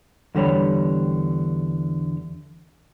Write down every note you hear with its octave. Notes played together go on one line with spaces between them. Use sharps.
E2 D3 G3 C#5 B5